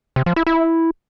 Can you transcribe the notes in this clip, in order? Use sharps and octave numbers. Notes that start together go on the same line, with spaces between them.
C3
F3
E4
E4